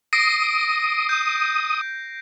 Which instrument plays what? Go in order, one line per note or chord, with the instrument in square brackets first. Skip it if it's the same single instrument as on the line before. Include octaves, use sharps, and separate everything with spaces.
[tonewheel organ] D#6 [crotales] A#6 C7 D7
[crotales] G6